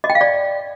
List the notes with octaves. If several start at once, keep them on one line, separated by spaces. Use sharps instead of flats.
D#5
G5
F5
D5